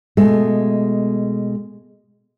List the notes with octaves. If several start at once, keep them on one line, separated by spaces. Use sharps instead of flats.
B2 G#3 A3